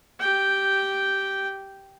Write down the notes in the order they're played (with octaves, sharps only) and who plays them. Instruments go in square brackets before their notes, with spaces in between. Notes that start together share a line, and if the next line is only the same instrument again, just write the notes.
[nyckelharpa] G4 G5